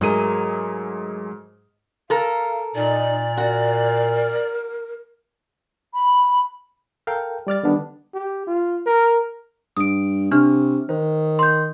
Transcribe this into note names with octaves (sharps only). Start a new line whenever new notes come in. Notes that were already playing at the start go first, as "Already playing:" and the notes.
G#2 F#3 A3 G#4 A#4 D#7
A4 A#4 F5
A#2 D#4 D5
F#4 A#4
B5
A4 A#4 F5 G5
G3 D5 F6 A6
D3 D#3 G3 B3 D4
G4
F4
A#4
G2 D#6 D7
C3 D4 C#6 F6
D#3 C5
C6 G6